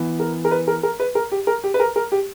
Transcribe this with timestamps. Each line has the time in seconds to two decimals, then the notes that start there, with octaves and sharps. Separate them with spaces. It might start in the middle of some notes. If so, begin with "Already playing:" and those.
Already playing: E3 B3
0.20 A#4
0.45 A#4
0.51 B4
0.68 A#4
0.83 A#4
1.00 B4
1.15 A#4
1.32 G4
1.47 A#4
1.64 G4
1.74 B4
1.80 A#4
1.96 A#4
2.12 G4